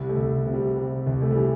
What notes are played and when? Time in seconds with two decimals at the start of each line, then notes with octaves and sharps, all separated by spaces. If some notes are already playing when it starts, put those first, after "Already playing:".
Already playing: C2 G3
0.09 A3
0.17 C2
0.47 C3
0.54 G3
0.76 C3
1.07 C2
1.21 A3
1.31 G3
1.37 E3